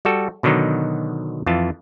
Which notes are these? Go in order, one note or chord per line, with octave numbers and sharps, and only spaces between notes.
G3 F#4 A4
B2 D3 D#3 F#3 D#4
F2 E3 F4 A5